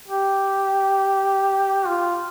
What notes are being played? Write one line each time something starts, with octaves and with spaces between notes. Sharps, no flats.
G4
F4